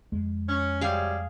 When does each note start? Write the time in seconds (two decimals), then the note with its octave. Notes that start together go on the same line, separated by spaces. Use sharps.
0.12 F2 G#3
0.48 C#4
0.81 C3 F#3 G3 G#4 F5